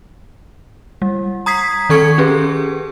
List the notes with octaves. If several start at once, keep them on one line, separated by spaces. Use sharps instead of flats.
G3
A#5 D#6 G#6 B6 C7
D#3 A4 C#6 G#6 C#7
C#4 G4 G#4 B4